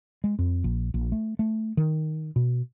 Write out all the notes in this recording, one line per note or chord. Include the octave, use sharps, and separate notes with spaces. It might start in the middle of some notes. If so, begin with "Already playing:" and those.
G#3
F2
A#1
A#1
A3
A3
D#3
B2